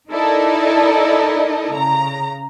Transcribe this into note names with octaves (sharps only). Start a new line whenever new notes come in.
D#4 E4 A4 A#4 D5 D#5
C#3 A#5